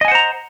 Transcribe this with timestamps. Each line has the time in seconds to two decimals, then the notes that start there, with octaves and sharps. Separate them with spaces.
0.01 D#5
0.05 G#5
0.08 F#5
0.12 C5
0.15 A#5